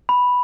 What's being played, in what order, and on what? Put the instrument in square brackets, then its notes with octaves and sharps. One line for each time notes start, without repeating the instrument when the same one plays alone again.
[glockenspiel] B5